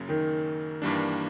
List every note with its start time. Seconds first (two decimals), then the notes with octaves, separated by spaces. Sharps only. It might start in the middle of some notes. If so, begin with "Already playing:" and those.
Already playing: F#2 C#3 F#3 A#3
0.09 D#3
0.82 G2 E3 G3 A#3 D4